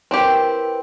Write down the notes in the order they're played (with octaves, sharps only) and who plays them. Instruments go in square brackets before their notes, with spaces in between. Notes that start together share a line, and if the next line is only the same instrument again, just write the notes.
[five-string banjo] C4 E4 G4 [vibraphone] A#4 B4